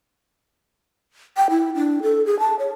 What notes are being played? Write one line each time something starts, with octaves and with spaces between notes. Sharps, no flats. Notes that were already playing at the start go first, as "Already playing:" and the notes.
G5
E4
D4
A4
G#4
A5
C#5